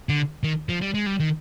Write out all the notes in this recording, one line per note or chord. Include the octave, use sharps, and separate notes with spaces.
D3
D#3
F3
G3
G#3
G3
D#3